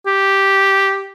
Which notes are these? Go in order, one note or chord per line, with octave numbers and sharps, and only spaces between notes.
G4